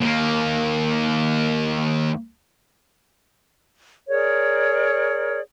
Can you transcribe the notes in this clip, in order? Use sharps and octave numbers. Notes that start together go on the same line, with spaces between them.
D#2 A#3
G#4 A#4 C#5 D5